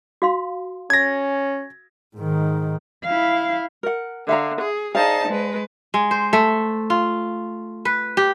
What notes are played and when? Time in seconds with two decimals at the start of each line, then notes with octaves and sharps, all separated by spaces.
0.22 F#4 F5 C6
0.90 C#4 G#6 A#6
2.15 G#2 D#3
3.04 E4 F5
3.83 A#4 F#5
4.29 D3 E5 F5 A#5
4.62 G#4
4.95 D#4 G#4 C5 D5 F5 A5
5.28 G#3 B4
5.94 G#3
6.11 C5
6.33 A3
6.90 F4
7.85 B4
8.17 G4